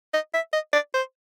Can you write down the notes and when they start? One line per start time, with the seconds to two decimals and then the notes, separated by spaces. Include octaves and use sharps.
0.14 D#5
0.34 E5
0.53 D#5
0.73 D5
0.94 C5